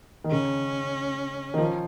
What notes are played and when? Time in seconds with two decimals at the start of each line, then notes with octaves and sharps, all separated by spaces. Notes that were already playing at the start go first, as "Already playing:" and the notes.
0.24 D#3
0.31 C#3 C#4
1.54 D#3
1.58 F3